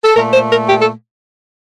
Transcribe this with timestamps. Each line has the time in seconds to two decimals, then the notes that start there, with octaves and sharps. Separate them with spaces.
0.03 A4
0.15 A#2 A3 A#4
0.33 C5
0.50 A#4
0.68 G4
0.81 A4